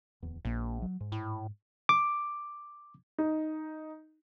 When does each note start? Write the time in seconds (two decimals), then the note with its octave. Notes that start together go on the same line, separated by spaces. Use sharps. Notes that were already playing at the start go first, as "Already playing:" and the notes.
0.23 D1 E2
0.45 A#1 A#2 A#3
0.82 F#3
1.00 G#2
1.12 A2
1.89 D6
3.18 D#4